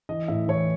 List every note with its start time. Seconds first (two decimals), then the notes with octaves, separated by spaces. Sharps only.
0.09 E3 D#5
0.28 A2 E5
0.48 E3 C#5